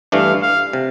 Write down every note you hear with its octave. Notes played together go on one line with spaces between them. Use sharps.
G2 E3 A3 D4 F5
F5
C3